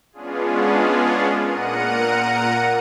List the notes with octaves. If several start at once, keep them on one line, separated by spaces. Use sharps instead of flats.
G#3 B3 C#4 D4 F4 G#4
A#2 A#4 F#5 A#5 C#7 D#7